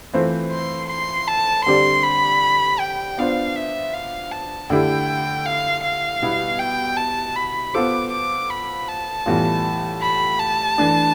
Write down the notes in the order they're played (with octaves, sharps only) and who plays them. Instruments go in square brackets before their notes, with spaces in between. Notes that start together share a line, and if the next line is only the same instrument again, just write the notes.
[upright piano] E3 A3 C4 F4 C5
[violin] C6
C6
A5
[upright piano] D3 G3 C4 G4 D5 [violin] C6
[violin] B5
G5
[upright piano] B3 D4 F4 C5 [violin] F5
[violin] E5
F5
A5
[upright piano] D3 A3 E4 G4 [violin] G5
[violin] F5
F5
[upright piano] B2 G3 B3 E4
[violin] G5
A5
B5
[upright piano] B3 F4 A4 C5 [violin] D6
[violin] D6
B5
A5
[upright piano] A2 E3 G3 B3 F4
[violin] B5
A5
[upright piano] E3 A3 D4